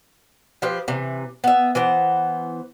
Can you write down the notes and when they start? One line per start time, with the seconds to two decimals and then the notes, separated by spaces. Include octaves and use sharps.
0.62 F3 G4 B4 C5
0.88 C3 E3
1.44 B3 E5
1.75 E3 B3 C5